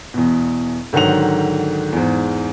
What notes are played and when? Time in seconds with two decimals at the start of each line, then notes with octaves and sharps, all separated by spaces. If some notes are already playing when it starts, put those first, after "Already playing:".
0.14 E2 B2
0.93 G#2 D3 D#3 F#3 F#5 F7
1.93 E2 G#2